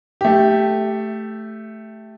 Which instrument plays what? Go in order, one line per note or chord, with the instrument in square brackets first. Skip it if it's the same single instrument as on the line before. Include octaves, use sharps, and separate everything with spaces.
[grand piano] A3 G4